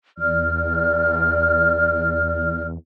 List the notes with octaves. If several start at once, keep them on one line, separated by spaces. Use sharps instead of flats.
E2 D5 F6